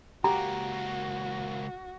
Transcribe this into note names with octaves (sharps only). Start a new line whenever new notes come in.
C#2 A#3 F#4 G4 A#5